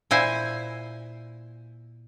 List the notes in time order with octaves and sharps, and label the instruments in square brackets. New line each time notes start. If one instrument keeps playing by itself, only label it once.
[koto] A#2 E4 C5 G#5